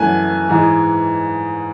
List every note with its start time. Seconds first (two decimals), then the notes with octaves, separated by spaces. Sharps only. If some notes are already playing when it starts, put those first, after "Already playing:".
Already playing: F#2 E3 A3 G#5 F#6
0.49 G#2 E3 G#3